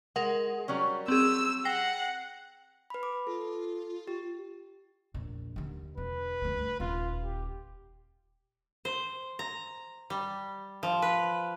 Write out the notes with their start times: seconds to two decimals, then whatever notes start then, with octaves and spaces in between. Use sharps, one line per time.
0.16 G#3 A#4 F#5
0.68 F#3 G3 C#4
1.08 C4 G#4 E6
1.65 F#5 G5 A#6 C7
2.90 B4 B5
3.03 D6
3.27 F4 A4
4.07 G4
5.14 A#1 E2
5.56 D#2 D3
5.97 E1 B4
6.42 D2 G2
6.80 D#1 F4
7.24 G4
8.85 C5
9.39 A#5
10.10 G3
10.83 F3
11.02 B4